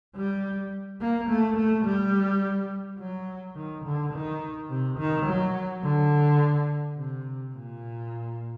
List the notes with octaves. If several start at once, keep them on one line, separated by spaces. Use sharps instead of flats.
G3
A#3
A3
A3
G3
F#3
D#3
D3
D#3
C3
D#3
F#3
D3
C3
A#2